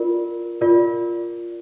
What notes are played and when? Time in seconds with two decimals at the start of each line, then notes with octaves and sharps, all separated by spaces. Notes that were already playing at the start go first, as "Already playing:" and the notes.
Already playing: F4 A#4 D5
0.61 F4 A#4 D5